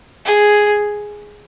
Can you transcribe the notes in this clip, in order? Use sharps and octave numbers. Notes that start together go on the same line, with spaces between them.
G#4